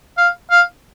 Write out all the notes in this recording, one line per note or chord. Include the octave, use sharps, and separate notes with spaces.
F5
F5